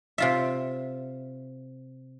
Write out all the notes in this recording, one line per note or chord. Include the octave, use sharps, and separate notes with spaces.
C3 F4 E5